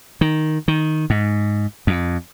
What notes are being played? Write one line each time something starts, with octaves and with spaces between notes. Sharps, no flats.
D#3
D#3
G#2
F2